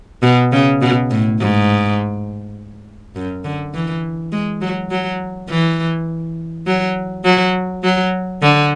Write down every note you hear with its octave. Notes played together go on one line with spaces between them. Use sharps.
B2
C#3
B2
A2
G#2
F#2
D3
E3
G#3
F#3
F#3
E3
F#3
F#3
F#3
D3